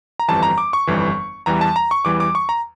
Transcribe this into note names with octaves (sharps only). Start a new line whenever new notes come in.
A#5
G1 F2 E3 G3 A5
A#5
D6
C#6
G1 F2 E3 G3
E2 E3 G3 A#5
A5
A#5
C#6
E2 E3 G3 D6
D6
C#6
A#5